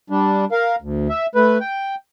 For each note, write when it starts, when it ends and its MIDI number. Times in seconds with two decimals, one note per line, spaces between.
0.10 0.45 55
0.10 0.45 62
0.52 0.76 70
0.52 0.76 77
0.82 1.08 38
1.09 1.26 76
1.35 1.58 57
1.35 1.58 71
1.61 1.95 79